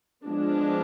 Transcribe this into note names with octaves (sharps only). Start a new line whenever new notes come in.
F3 G#3 B3 D4